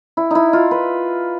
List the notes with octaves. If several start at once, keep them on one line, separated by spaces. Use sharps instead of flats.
E4
D#4 E4
F4
B4